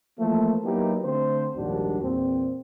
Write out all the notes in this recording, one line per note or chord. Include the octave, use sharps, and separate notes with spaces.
E3 F3 A3 A#3
F#3 A#3 B3 D#4 E4 G4
D3 A3 C4 C5
A#1 D#2 G#2 G3 D4 F#4
E2 A#2 C4